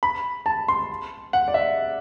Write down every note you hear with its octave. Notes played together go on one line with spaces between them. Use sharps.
B5
A5
C6
F#5
D5
E5